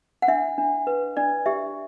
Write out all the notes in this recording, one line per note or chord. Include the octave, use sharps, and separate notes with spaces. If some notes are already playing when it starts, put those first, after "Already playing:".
F#5
D4 E5
D4
B4
D4 D5
G4 E5